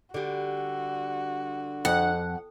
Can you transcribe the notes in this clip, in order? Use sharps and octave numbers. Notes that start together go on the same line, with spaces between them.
D3 G3 F#4
F2 F#5